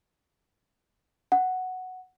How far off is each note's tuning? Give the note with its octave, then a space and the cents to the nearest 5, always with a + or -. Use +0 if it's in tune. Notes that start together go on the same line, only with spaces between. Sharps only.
F#5 +0